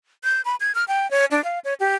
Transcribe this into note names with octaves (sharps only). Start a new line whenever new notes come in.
G6
B5
G#6
F6
G5
C#5
D4
F5
C#5
G4